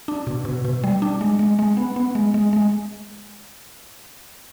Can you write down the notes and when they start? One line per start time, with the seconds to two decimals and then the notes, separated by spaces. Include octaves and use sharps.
0.08 D4
0.27 B2
0.45 B2
0.65 B2
0.84 G3
1.02 D4
1.21 G#3
1.39 G#3
1.59 G#3
1.77 B3
1.96 B3
2.15 G#3
2.34 G#3
2.53 G#3